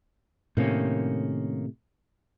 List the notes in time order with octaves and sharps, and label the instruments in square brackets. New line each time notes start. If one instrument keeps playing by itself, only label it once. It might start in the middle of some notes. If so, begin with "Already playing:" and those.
[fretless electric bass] A2 C3 [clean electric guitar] D#3 A#3 C#4